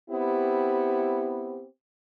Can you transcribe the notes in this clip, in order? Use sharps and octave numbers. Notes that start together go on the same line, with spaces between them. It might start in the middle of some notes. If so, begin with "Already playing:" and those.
B3 C4 E4 G4